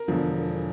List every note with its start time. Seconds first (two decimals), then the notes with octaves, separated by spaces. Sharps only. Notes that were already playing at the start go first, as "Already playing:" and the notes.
Already playing: A#4
0.08 E1 E2 D3 F3